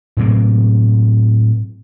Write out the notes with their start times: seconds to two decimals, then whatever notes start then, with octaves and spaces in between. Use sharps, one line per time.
0.17 A2 C3 F#3 A#3